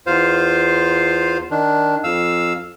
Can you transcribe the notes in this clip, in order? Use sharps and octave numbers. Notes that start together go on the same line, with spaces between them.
E2 F4 C5 F5
D#3 D4
F2 F5 E6